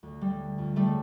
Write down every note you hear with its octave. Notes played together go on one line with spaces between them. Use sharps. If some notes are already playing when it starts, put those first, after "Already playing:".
D2
G3
D3
F2
G3 A3
C#3